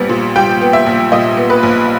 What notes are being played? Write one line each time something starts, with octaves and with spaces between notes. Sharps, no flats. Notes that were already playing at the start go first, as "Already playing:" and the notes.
Already playing: A#1 G3 B3
A#2
G3 G5
B3
E5
A#1
A#2 D#5
B3
B4
A#1